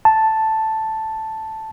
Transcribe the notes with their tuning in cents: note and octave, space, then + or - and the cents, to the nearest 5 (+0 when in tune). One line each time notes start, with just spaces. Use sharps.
A5 +0